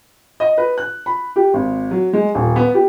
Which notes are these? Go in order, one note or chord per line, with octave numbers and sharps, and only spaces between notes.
D#5
B4
F#6
B5
G4
G#1
F#3
G#3
D#1
B3
G4